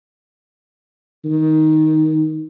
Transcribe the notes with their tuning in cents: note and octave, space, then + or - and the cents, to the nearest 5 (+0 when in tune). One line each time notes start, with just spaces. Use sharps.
D#3 +10